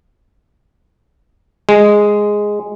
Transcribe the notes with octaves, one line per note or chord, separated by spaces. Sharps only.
G#3